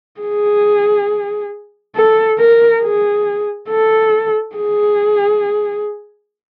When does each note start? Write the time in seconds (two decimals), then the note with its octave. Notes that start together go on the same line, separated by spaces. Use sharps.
0.20 G#4
1.95 A4
2.38 A#4
2.82 G#4
3.69 A4
4.56 G#4